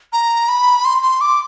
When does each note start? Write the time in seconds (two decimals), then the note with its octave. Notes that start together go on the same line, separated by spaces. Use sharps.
0.13 A#5
0.48 B5
0.85 C6
1.03 C6
1.21 D6